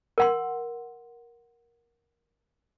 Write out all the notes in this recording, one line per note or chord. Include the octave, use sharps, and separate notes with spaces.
A#4 F#5 C6